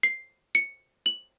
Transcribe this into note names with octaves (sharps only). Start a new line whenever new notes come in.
C7
C#7
F#7